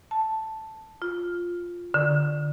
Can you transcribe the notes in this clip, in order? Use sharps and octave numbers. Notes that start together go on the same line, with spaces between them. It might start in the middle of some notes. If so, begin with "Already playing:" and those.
A5
F4
D3